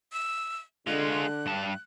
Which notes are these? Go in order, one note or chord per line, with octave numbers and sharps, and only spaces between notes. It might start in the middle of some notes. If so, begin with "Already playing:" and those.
E6
D3 G#3 F4 F#6
G2 A5